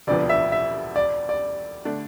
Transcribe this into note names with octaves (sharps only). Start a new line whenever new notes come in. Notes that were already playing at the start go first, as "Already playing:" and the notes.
E1 D2 C3 F3 B3 D5
E5
E5
D5
D5
D3 A3 D4